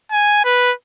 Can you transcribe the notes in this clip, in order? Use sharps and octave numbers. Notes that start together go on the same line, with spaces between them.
G#5
B4